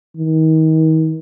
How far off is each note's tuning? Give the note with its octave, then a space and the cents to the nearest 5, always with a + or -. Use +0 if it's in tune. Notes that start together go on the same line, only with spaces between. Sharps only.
D#3 +35